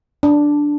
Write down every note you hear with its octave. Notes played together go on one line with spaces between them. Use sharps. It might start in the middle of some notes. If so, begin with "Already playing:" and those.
D4